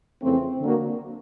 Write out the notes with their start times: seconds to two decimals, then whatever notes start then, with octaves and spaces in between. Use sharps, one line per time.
0.22 F2 C#3 E3 A3 C4
0.61 D3 F#3 A#3